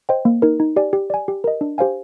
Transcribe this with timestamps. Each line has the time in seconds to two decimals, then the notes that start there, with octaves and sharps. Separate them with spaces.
0.09 C5 D#5 G5
0.25 A#3
0.42 D#4 A#4
0.60 D#4
0.76 G4 D5 G#5
0.93 G4
1.10 D5 G#5
1.28 G4
1.44 A#4 D#5
1.61 D4
1.78 G4 C5 F5 G#5